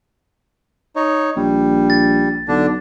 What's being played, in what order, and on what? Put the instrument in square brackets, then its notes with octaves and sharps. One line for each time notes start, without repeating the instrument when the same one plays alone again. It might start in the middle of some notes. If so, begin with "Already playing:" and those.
[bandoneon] D#4 C#5
[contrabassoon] A#1 [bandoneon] G3
[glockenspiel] A6
[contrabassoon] B1 [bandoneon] D3 D4